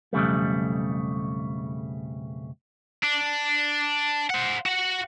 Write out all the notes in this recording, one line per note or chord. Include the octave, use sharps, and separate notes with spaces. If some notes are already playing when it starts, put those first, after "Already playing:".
B1 F2 C#3 G3 A3
D4
C5 F#5
F#4 F#5